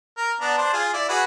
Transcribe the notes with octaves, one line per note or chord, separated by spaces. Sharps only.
A#4
B3 D4 A#5
D4 C5
F4 G#4
E4 D5
F#4 G#4 B4